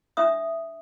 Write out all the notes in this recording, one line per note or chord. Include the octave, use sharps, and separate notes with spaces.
D4 E5 D#6